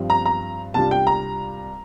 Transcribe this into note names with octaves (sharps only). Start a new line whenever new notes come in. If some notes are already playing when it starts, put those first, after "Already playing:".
Already playing: G2 F3 C4
A#5
A#5
C2 C3 G3 D4 F4 A5
G5
A#5